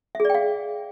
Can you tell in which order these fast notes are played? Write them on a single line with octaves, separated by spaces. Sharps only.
E5 G#4 D5 G5 F5